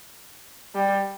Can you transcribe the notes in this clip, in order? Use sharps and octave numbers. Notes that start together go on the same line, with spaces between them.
G3